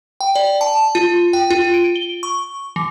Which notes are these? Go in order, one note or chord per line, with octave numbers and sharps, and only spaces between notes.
G5
D5
A5
F4
G5
F4
D7
G7
C#6
E3